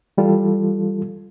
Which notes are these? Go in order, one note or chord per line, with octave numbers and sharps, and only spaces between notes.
E3 G3 F4 A4